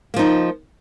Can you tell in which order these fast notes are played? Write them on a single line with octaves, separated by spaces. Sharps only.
A#3 F3 D#4